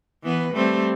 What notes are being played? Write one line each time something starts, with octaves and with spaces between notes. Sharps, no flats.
E3 B3 B4
G3 A3 C4